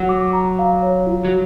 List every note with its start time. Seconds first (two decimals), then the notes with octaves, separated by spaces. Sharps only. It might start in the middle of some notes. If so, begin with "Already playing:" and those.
Already playing: F#3 F#5
0.09 D6
0.33 A#5
0.59 F5
0.82 C#5
1.07 F4
1.24 F#3